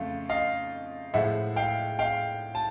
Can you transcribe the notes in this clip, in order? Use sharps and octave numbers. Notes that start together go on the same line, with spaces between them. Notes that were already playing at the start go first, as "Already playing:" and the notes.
Already playing: F2 C#3 A3 F5
D#5 F5
A2 F3 G#3 E5 F#5
F5 G5
F5 G5
A5